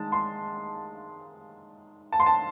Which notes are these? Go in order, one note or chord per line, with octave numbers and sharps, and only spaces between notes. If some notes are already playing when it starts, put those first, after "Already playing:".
Already playing: D#3 G#3 A5
C6
A5
C6
A5